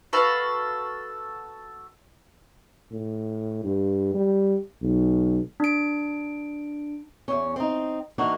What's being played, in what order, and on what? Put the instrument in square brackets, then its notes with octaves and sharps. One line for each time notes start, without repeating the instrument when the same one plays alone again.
[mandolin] F#4 A4 B4 F5
[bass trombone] A2
G2
G3
B1
[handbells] D4 D7
[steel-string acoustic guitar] E2 C#4
C4 D#4
E3 A#3 D4 D#4 F#4 A#4